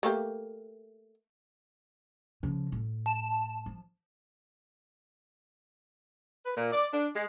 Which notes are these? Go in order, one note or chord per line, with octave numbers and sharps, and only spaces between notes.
A3 A#3 G4
C#3 F3
A2
A5
F3
B4
A#2
D5
D4
G#3